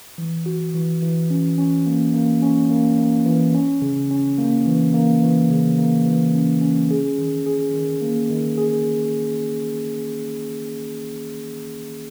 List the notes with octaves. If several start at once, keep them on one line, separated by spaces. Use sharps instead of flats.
E3
F#4
E3
E3
C#4
C#4
A#3
A#3
C#4
A#3
A#3
E3
C#4
C#3
C#4
A#3
E3
A#3
E3
C#3
A#3
E3
C#4
C#4
G#4
D#3
G#4
D#3
A#3
D#3
G#4